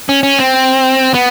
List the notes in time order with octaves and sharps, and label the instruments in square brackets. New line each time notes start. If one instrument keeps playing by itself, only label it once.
[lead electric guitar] C#4
C#4
C4
B3